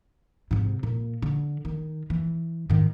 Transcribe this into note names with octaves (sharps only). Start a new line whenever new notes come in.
G#2 C3
A#2
D3
D#3
E3
G#2 D#3